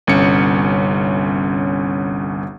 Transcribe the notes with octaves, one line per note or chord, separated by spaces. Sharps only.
G1 C2 C#4 C#7